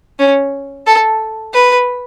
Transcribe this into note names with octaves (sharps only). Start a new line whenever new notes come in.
C#4
A4
B4